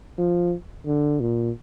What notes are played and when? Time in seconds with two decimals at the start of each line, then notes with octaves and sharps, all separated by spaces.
0.18 F3
0.86 D3
1.21 A#2